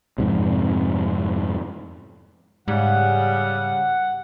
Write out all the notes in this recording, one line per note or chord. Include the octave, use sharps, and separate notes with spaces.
F2 G#2 C3
G#2 C#3 G3 F#5